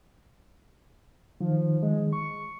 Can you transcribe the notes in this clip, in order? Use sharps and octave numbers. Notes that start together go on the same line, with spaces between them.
D#3 F3
G#3
C#6